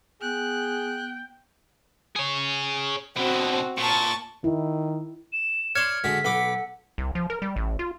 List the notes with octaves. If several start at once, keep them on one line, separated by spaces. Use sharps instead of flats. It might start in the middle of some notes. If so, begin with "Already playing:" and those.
B3 G#4 G5 F#6
G#4 C#5
B2 D3 C4 F#4
A#2 A5 C#6
D#3 E4
E7
C#5 D5 C6 F6 G#6 C#7
D3 G#3 F#4 B6
B1 A4 F#5 B5 D6
C2
F3
A#4
G3
A1
F4